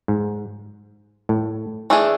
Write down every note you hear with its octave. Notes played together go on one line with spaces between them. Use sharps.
G#2
A2
E3 A3 D4 G#4